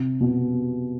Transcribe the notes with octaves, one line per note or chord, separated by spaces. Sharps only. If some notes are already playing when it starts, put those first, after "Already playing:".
Already playing: C3
B2